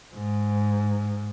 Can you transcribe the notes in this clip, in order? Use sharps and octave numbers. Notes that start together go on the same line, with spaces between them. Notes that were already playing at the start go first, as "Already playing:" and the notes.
G#2